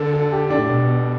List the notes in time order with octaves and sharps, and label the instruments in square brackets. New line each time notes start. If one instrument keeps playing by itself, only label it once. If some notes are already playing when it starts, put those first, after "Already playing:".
Already playing: [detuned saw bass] D3 [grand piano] A4
[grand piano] A4
G4
D4
[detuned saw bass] A2
B2